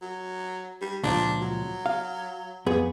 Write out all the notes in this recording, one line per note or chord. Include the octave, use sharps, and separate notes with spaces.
F#3
G3
C#2 A#2 F3 D4
F#3
F5
F2 B3 G#4